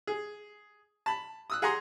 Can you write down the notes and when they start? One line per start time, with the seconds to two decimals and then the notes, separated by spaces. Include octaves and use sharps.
0.07 G#4
1.06 A5 B5
1.50 D#6 E6 F#6
1.62 G#4 F#5 G#5 A#5 C6 D#6